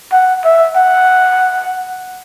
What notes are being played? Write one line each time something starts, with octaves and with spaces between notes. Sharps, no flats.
F#5
E5
F#5